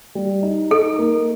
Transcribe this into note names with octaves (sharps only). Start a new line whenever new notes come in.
G3
D#4
D#4 A4
A#3